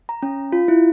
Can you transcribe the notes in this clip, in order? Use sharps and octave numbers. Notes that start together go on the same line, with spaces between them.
A#5
C#4
F4
E4